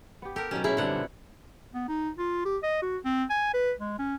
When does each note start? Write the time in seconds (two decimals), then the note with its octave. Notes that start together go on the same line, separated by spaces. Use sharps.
0.22 B3 G4
0.36 G4 A4 A#4
0.51 B2 F#3 C#4 D#4 G4
0.64 C#4 E4 G#4
0.77 F#2 B2 D3 G3 C4 D4 F#5
0.90 A#2
1.74 B3
1.88 D#4
2.18 F4
2.45 G4
2.63 D#5
2.82 F#4
3.05 C4
3.30 G#5
3.54 B4
3.79 G#3
3.98 C#4